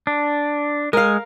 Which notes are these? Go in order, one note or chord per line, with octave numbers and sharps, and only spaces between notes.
D4
G#3 A#4 F5